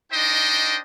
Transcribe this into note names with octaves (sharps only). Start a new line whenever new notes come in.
D4 D#4 C5 D#5 G5